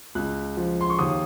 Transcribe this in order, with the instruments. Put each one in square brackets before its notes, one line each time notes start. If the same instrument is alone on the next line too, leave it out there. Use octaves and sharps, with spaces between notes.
[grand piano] C#2 F#6
F3
C6
C#6
D#2 D#6